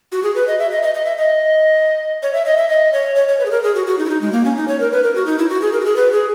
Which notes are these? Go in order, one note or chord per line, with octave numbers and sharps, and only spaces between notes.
F#4
G#4
B4
D#5
E5
D#5
D#5
D#5
E5
D#5
C#5
E5
D#5
E5
D#5
C#5
C#5
C#5
B4
G#4
A#4
G#4
F#4
F#4
D#4
E4
D#4
G#3
A#3
C#4
D#4
C#5
A#4
B4
A#4
F#4
D#4
E4
F#4
G#4
A#4
F#4
G#4
B4
G#4